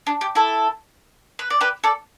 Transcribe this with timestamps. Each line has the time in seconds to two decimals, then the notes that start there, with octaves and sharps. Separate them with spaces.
0.07 D4
0.21 G4
0.35 E4 A4
1.39 B4
1.50 D5
1.61 G4 B4
1.84 A4 D5